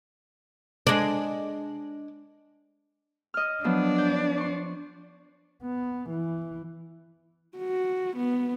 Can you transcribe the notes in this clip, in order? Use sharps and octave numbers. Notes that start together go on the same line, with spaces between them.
G#3 D4
D#5 F6
F3 F#3 B3 D4
D5 G6
C6 C#6
B3
E3
F#4
B3